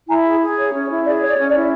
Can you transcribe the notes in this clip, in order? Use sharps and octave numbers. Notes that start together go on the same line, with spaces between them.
E4 G#5 A#5
G#4
G#4
C#5
C#4
E4
G#4 D5
C#5
D5
C#4
D5
E4